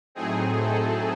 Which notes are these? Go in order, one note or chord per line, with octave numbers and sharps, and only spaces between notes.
A2 F#3 A3 C4 D#4 G#4
A4